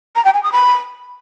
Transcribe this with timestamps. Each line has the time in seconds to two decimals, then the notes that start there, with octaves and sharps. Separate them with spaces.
0.16 A#5
0.25 G5
0.34 G#5
0.43 D#6
0.52 B5